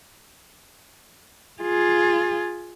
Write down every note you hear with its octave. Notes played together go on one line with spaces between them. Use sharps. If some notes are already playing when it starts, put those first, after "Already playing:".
F4 G#4